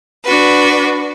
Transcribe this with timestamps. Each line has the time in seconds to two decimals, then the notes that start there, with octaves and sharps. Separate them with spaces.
0.24 D4 F#4 B4